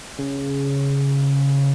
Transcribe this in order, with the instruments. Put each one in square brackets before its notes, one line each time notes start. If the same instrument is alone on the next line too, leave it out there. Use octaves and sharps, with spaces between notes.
[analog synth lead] C#3